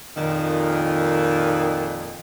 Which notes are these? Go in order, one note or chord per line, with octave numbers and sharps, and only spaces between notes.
F2 A#2 D#3